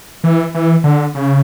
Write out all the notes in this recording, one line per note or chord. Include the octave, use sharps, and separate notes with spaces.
E3
E3
D3
C#3